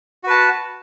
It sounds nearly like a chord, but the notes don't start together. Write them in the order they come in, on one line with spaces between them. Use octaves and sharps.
F#4 B4 A5